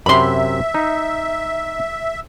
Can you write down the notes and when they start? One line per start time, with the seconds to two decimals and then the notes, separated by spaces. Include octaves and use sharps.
0.06 F#2 C3 E5 B5 C6
0.74 D#4